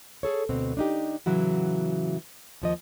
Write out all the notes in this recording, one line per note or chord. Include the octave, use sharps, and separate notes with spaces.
G#4 A4 C#5
D2 B2 C4
D4 D#4 G4
A2 C#3 E3 F#3 E4 F#4
D#2 F3 D#5